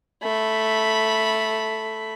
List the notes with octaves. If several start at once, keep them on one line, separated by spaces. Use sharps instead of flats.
A3 B5